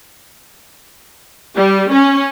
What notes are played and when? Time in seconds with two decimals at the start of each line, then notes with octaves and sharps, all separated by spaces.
1.57 G3
1.92 C#4